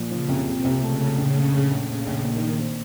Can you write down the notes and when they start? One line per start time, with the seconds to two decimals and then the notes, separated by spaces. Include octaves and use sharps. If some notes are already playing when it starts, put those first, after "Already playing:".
Already playing: A#2 F3
0.11 C#3 F3
0.28 C2
0.46 C2 C3
0.64 C2
0.82 C#3 A3
0.99 A3
1.17 A#1 C#3
1.35 A3
1.52 A#1
1.71 A#1
1.89 A#1 C#3
2.06 A#1
2.24 A#2 D#3
2.41 A#2
2.60 C4